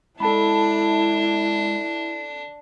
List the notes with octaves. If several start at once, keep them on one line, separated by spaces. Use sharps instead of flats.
G#3 D4 E4 A4 A5 B5